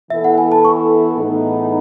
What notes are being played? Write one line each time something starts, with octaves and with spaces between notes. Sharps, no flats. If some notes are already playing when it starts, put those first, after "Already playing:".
E3 B3 E4 A4 E5
F#5
G#5
A5
C#6
A2 E3 B3 D#4 G#4